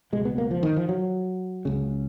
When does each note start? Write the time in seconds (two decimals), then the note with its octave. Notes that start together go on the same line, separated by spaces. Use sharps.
0.13 C#2 B2 G#3
0.25 B3
0.38 A#3
0.51 F3
0.63 D#3
0.76 F3
0.89 F#3
1.65 C#2 C#3